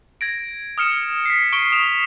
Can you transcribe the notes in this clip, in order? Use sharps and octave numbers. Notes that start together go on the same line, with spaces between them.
G#6 A#6 D7
D#6 F6 C#7 E7
B6 C7
C#6 D7 G7
D#6 E7 F7